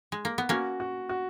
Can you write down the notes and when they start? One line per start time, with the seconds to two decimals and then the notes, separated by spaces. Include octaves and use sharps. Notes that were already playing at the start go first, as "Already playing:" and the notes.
0.12 G#3
0.25 A#3
0.38 B3
0.49 A#3 C#4 F#4
0.80 F#4
1.09 F#4